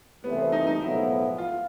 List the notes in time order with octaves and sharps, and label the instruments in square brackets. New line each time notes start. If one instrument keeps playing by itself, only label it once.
[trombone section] C2 C3 E3 A3 [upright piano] B3
[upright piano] C4
D#4
D#4
[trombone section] B1 A2 F3 G#3 B3 [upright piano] E4
[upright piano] F4